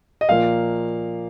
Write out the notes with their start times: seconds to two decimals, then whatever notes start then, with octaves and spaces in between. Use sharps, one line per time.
0.21 D#5
0.29 A#2 F3 A#3 F5